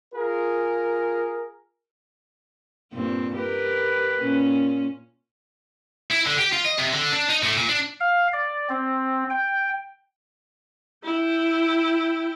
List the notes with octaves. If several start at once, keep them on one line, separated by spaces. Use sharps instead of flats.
F4 G#4 A#4
G2 A#2 C4
G4 A#4 B4
A#2 C#4
E4
D3
G4
F4
D#5
C3
D3
D4
D#4
A2
A#2
D4
F5
D5
C4
G5
E4 G5